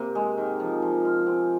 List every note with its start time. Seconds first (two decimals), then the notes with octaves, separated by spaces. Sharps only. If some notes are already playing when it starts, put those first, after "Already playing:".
Already playing: C3 A#3 C4
0.15 G#3
0.37 D#3
0.60 F3
0.82 F3
1.05 F4
1.27 C4